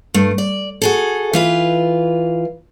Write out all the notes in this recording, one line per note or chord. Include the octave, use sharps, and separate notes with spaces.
G2 A3
D5
F#4 G#4 A4
E3 F4 B4